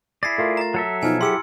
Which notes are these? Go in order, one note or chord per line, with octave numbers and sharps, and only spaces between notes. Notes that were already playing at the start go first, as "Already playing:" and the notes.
E4 G#4 D5 A#6 C7
A3 F4 A#4
A#5 A6
F#3 A4 E5
B2 F3 D#4 G#5 F6 G#6
E4 G4 G#4 C6 E6 C#7